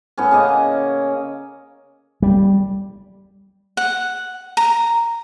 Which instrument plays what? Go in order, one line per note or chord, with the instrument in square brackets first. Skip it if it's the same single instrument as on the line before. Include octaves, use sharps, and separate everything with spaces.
[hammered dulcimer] A2 B3 C#4
C#3 A#3 D#5
[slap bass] G3
[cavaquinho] F#5
A#5